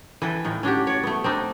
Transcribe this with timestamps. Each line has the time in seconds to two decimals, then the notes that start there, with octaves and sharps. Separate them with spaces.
0.22 E3 A4 B4 G5
0.44 A2 D#3 F4
0.63 C#4 D4 F#4 G4
0.87 C#5 D5
1.03 A3 B3
1.24 C4 D4 D#4